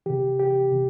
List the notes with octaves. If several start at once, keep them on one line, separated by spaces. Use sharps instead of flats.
C3 E3 G4
G4
C3